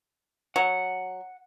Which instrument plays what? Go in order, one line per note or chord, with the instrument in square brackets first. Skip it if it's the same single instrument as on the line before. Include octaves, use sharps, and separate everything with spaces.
[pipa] F#3 [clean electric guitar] F#5